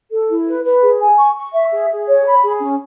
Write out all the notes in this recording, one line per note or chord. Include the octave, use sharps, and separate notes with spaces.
A4
E4
B4
B4
G#4
G#5
C#6
C#6
E5
G#4
G#4
C#5
B5
G#4
C#4